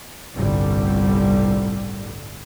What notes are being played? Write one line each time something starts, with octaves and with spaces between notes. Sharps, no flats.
G1 C2 A2 D3 G3